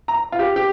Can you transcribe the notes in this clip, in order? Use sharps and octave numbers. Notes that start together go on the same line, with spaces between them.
A#5
F4
G4
G4